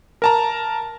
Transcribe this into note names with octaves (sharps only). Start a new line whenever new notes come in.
A#4 A5 A#5